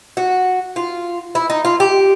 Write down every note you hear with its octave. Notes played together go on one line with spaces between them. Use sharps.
F#4
F4
E4
D#4
F4
G4